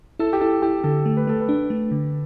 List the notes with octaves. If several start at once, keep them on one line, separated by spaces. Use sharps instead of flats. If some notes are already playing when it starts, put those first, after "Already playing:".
E4 A4
G4
E4 A4
E4 G4
D3 A4
A3
B4
A3 A4
B4
D4
A3
D3